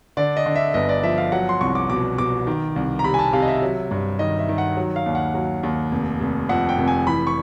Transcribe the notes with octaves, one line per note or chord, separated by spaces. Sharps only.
D3 D5
D#5
D3
E5
G1 D#5
D5
F3 E5
F5
F#3 F#5
C6
C2 C#6
D6
B2 D6
B2 D6
D#3
C2
A#5
C3 B5
G#5
A5
C3 F5
D#5
E5
F#3
G2
D#3 D#5
E5
D#3
F#5
F#3
F5
D#2
F#5
F#3
D#2
F1
F1
F2 F#5
G5
F1
G#5
E3 B5
C#6